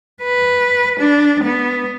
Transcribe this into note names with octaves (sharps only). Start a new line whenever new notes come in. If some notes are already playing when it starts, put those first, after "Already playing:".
B4
D4
B3